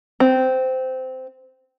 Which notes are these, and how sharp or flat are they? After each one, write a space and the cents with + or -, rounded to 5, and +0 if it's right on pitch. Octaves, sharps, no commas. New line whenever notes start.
C4 -15